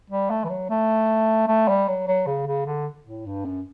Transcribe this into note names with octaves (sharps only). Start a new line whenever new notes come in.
G3
A3
E3
F#3
A3
A3
G3
F#3
F#3
C#3
C#3
D3
A2
G2
F#2